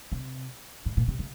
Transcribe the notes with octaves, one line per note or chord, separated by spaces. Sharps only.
C3
G#2
A#2
C3
C#3